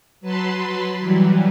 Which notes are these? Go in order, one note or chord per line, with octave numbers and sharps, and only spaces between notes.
F#3 B4 A5 B5 C6
E3 F#3 G3